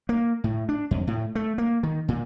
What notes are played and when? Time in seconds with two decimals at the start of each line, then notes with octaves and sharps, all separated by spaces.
0.09 A#3
0.44 A2
0.69 D4
0.91 F2
1.07 A2
1.35 A3
1.58 A#3
1.83 D#3
2.08 A#2